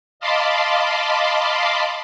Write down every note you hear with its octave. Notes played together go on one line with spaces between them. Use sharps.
D#5 F5 A5 B5 C6 D6